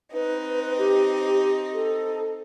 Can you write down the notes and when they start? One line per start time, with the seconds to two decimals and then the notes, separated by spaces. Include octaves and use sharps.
0.13 C4 D#4 B4
0.78 G4
1.74 A4